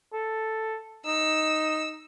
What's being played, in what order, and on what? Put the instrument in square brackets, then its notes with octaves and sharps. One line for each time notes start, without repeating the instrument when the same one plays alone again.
[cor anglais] A4
[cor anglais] D#4 [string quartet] E6